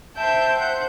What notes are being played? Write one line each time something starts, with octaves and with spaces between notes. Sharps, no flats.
C5 E5 G5 A5 G6
C5 F#5 G6